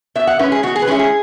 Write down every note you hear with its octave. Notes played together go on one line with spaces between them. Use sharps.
B2 E5
F#5
G#3 C#4 E4 B4
G#4
B2 F#4
G#4
B4
G#3 C#4 E4 G#4
G#4